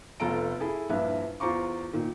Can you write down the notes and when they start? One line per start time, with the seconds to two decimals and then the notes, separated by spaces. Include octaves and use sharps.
0.20 F1 B3 F4 A4 A#5 D7
0.60 E4 G#4 A4
0.89 A#1 G2 E4 B4 E5 F5
1.40 E2 F4 C5 A#5 C#6 D6
1.93 A#2 D#3